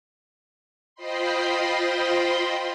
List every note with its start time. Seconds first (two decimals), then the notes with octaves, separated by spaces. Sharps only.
0.95 F4 C5 D#5 G5 B5 C6